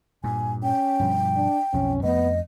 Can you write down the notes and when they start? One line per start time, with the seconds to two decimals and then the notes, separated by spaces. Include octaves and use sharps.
0.24 G2 A#2 G#5
0.63 C#4 G5
1.00 G2 B2 F3
1.36 D4
1.73 B1 F2 F3 C#4
2.03 F2 A3 B3 D#5